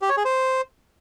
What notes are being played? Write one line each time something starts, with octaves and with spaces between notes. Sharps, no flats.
G4
C#5
G#4
C5